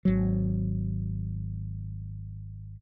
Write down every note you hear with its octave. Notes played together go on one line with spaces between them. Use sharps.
G#1 F#3